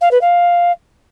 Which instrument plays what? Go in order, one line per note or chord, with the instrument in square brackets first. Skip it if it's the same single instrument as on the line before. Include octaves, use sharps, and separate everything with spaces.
[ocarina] F5
B4
F5